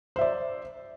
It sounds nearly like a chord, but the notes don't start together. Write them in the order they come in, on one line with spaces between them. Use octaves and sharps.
C5 E5 D5